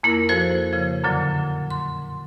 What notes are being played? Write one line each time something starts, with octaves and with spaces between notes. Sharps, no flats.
F2 A#3 E4 A#4
F3 F#4 A4 C5
C#3 F3
F#2 A#2 D3 F#3
C6